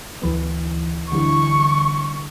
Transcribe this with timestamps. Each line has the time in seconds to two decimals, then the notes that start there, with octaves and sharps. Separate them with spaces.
0.22 D2 E3 B3
1.12 D3 E3 G3 C#6